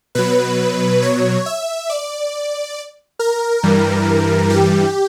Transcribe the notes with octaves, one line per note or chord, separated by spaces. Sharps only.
B2 F#3 B4
C#5
E5
D5
A#4
G2 E3 G3
G4